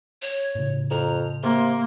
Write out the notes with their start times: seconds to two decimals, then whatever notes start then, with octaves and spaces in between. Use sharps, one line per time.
0.22 C#5
0.55 A2 C#3
0.90 F2 A#5
1.43 C3 A#3 C6